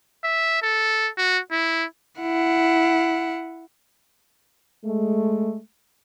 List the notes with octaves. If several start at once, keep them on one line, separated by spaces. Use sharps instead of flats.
E5
A4
F#4
E4
E4 F#5
G#3 A3